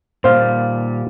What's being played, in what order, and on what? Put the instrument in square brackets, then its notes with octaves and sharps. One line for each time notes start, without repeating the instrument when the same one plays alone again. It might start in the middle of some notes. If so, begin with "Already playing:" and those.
[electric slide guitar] A#2 G3 [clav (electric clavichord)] C5 F5